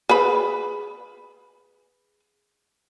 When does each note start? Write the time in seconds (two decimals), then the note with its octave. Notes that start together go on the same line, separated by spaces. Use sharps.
0.09 G#4 B4 B5